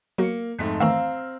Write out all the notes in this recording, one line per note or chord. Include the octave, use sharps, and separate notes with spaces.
F#3 A#3 F#4 C#7
F2 G#2 A3 F#6 B6
D#3 E3 A3 C4 F5 A#5 E6